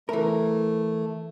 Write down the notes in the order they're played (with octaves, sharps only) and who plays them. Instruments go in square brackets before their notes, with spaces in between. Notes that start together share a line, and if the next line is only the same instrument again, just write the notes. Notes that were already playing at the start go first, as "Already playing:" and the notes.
[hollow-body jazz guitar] E3 A#4 [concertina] A3